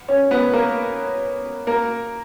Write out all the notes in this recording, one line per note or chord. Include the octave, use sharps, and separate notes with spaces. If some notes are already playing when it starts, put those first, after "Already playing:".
C#4 C#5
B3 B4
A#3 A#4
A#3 A#4